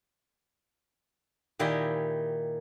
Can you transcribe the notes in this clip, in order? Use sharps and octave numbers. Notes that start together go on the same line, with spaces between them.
A#2 D#3 E4 G4 D#5 G#5